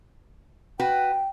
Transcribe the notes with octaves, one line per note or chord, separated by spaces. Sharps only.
F#4 B4 G5